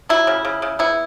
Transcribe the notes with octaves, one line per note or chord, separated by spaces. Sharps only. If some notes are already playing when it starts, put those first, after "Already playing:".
F#3 E4
C#3
C#3
C#3
B3 E4